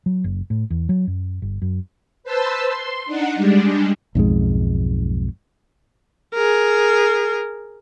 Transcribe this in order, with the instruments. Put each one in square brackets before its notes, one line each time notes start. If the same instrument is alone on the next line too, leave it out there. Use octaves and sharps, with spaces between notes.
[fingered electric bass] F#3
F#1
A2
E2
F#3
F#2
G1
F#2
[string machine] B4 C5 A5 C6 E6
C6
D4 D#4 F#5
G3 G#3 D4
[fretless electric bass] B1 F2 G#2 G#3
[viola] G#4 A#4